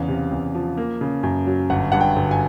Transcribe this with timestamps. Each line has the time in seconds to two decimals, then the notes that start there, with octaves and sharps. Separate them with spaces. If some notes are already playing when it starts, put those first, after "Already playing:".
Already playing: E2 C#3 F5
0.08 C3
0.32 E2
0.55 F3
0.77 A#3
1.01 C#3
1.23 F#2
1.47 F#3
1.70 G1 F#5
1.92 G2 F#5
2.00 G5
2.16 G1
2.31 G#5